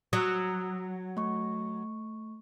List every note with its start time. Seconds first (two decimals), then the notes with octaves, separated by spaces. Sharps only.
0.13 F#3 D#6 E6
1.17 A3 C#6